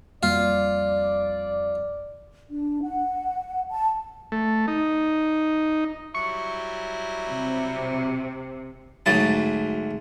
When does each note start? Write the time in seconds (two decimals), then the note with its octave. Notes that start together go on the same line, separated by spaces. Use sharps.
0.23 F2 G3 A#3 F4 D5
2.51 D4
2.82 F#5
3.70 A5
4.32 A3
4.68 D#4
6.14 F#3 G3 E4 C#6 C#7
7.28 C3
9.06 D2 G#2 F#3 A5